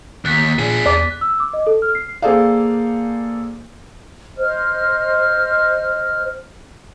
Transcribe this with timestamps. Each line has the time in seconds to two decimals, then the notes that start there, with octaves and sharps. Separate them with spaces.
0.25 D#2 F#6 A6 B6
0.59 A#2 D4 G#4
0.86 E2 D5
1.21 E6
1.40 D6
1.53 D#5
1.67 A4
1.82 F6
1.95 C7
2.22 A#3 G#4 A4 C5 D5 F5
4.37 C5 D#5 F6